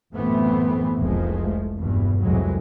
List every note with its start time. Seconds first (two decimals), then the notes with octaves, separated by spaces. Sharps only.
0.14 A1 F#2 E3 A3 B3 C4
0.98 F1 C2 F3 G#3 A3
1.75 F1 E2 G2 B2
2.22 C2 F2 A2 F#3 G#3